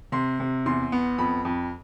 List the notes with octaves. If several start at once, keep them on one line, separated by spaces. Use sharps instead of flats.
C3 C6
C3
E2 C6
B3
F2 B5
F2